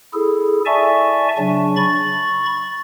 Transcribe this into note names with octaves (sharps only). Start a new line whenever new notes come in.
E4 G#4 A4
D5 E5 G#5 A5 C#6
C#3 F#3 D4
B5 C#6 A6